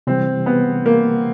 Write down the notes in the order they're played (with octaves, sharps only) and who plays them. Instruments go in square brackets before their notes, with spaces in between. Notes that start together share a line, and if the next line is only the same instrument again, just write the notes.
[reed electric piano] C3 E3 G3 [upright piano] C4
[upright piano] B3
A#3